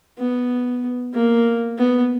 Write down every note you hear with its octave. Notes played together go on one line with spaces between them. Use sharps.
B3
A#3
B3